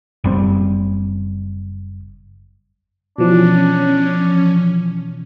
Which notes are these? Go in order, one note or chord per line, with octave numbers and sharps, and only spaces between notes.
F#1 G3 C4
B2 E3 F3 C#4 D4